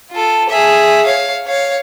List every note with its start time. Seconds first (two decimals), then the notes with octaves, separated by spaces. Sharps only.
0.11 F4 A4
0.49 G#4 E5
1.05 C#5 F5
1.48 C#5 F5